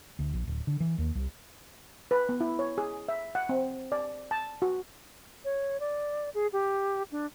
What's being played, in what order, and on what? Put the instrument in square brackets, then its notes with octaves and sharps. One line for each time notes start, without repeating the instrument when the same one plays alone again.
[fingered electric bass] D2
A#1
D1
D3
E3
D#2
C2
[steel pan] B4
B3
E4
C#5
G#4
E5
F#5
C4
D5
A5
F#4
[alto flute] C#5
D5
G#4
G4
D4